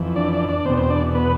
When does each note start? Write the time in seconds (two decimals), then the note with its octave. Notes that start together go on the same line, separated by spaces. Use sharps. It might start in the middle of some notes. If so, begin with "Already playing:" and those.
Already playing: F2 E3
0.16 D4 D5
0.32 D4 D5
0.49 D4 D5
0.65 E2 C4 C5
0.69 B2
0.77 C4 C5
0.90 D4 D5
1.15 B3 B4